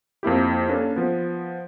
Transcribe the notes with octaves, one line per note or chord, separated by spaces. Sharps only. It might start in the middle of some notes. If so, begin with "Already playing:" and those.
F2 A#3 E4 G4
A#3 C#4 D4 A4
F3 B3